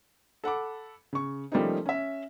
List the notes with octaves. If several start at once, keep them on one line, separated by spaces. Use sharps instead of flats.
A4 F#5 B5 D6
C#3 C#6
F3 G3 A3 A#3 C#4 D#4
C#4 E5